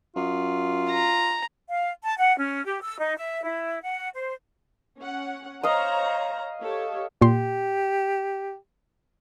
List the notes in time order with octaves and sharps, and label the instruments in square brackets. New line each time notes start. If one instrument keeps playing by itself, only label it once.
[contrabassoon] F#2 [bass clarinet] F4
[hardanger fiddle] A#5
[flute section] F5
A5
F#5
C#4
G4
E6
D#4
E5
E4
F#5
C5
[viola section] C#4 F#5
[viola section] C5 C#5 A#5 [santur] D#5 F5 D#6
[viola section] G4 A4 C#5
[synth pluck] A#2 C6 [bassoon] G4